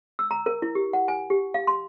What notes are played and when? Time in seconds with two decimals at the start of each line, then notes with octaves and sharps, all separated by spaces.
0.19 E6
0.31 A#5
0.46 A#4
0.62 E4
0.75 G4
0.93 F#5
1.08 G#5
1.30 G4
1.54 F5
1.67 C6